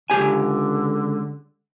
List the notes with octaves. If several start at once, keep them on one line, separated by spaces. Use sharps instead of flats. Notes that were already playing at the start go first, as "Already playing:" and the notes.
C#2 D3 G4 G#5